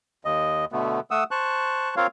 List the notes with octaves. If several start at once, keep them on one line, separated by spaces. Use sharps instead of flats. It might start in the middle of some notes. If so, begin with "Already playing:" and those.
D#2 D#5
B2 D3 A3 B3
A3 F#5 D#6 E6
C5 A5 C#6 F#6
C4 F4 A#4 C#5 F5